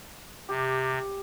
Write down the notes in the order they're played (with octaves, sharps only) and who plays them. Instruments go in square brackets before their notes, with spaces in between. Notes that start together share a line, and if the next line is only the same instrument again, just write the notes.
[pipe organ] C3 [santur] G4